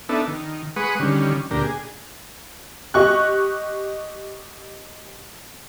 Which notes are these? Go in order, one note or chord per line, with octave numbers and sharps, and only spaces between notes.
B3 D4 D#4 A4 E5
D#3
G#3 B4 F#5 C#6 D#6
D3 D#3 G3 C#4
D2 A#2 D4 G4 A#4
G#4
G4 D#5 C#6 F#6